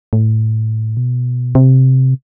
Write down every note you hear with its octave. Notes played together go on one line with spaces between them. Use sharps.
A2
B2
C3